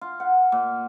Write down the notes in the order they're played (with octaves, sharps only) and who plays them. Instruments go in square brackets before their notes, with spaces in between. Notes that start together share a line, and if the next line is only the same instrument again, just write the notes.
[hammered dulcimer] F4
F#5
A#2